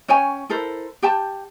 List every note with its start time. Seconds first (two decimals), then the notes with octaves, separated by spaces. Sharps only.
0.08 C#4 C#5 G5 G#5
0.49 E4 A4 A#4 C5
1.02 G4 G5 A5